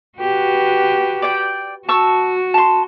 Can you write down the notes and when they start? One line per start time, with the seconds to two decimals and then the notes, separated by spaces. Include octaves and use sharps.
0.19 F#4 G4 B4
1.22 D5 G5
1.89 F#4 A5 C#6 E6
2.54 A5 C6